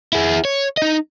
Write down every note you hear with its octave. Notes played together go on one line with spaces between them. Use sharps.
E4 G#4
C#5
D#4 D#5